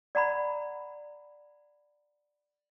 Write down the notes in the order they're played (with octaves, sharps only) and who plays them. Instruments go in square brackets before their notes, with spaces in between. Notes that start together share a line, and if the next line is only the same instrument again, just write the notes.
[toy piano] D5 F#5 A#5 B5